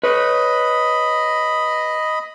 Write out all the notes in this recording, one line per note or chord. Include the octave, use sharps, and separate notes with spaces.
B4 C#5 D#5 B5